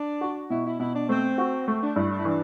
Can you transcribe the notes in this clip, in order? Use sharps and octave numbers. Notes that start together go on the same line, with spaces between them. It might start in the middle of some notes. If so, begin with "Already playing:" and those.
Already playing: D4
F#4
B2 E4
E4
B2 E4
D4
A3 C4
F#4
A3 C4
D4
G2 E4
D4
E4
E3 D4